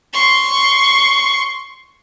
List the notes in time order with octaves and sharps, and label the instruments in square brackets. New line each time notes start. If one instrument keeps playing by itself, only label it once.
[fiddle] C6 C#6